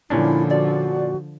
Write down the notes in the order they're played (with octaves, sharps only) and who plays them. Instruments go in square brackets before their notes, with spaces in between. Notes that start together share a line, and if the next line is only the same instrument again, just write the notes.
[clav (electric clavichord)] A#2 C#4 D4 [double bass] D3 F3 [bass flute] E4
[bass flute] F#4 [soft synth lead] D5